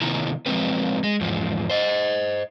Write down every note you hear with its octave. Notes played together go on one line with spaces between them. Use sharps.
C3 D#3 A3 B3 E4 A#5
F3 F#3 G#3 C4 B4
G#3
E2 G#2 F3
C5 D#5